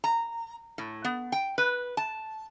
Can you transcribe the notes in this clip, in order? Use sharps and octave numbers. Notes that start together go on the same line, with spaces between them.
A#5
A2
B3
G5
B4
A5